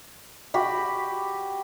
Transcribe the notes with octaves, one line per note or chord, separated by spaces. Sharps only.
F#4 G4 B5